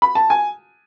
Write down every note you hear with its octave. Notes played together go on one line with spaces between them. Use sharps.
B5
A5
G#5